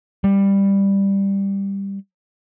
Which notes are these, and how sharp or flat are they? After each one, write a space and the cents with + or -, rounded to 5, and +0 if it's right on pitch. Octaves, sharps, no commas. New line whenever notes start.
G3 +10